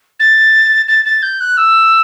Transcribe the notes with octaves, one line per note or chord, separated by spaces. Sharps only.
A6
A6
A6
G6
F#6
E6